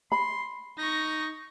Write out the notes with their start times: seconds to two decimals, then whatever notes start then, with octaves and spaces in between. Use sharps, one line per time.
0.12 B5 C6
0.78 D#4 C#6 A#6